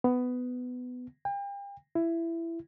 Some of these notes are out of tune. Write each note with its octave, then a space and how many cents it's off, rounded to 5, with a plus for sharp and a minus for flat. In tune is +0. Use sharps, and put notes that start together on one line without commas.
B3 +15
G5 +40
E4 +15